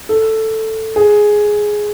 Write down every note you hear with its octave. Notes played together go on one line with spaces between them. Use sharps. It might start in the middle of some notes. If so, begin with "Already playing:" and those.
A4
G#4